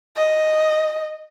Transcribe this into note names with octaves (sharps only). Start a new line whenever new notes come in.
D#5